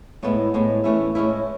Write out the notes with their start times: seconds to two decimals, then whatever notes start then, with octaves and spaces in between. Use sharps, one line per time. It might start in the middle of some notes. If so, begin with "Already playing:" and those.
0.23 A2 G#3 B3 E4
0.54 A2 G#3 B3
0.84 E3 A3 C#4 E4
1.15 A2 G#3 C#4 E4